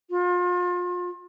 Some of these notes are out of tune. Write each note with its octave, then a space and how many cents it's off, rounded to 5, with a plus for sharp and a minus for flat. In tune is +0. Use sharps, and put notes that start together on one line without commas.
F4 +35